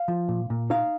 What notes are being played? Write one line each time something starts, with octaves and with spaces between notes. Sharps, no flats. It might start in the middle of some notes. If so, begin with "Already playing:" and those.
Already playing: F5
F3
A#2
A#2
D#4 F5